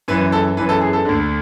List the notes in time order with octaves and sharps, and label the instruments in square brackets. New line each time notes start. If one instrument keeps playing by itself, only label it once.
[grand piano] F#2 E3 B4
A4
F#2 E3 B4
A4
G#4
A4
D2 D3